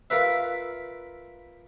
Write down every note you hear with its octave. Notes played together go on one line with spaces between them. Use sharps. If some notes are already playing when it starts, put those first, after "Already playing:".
F4 A#4 B4 E5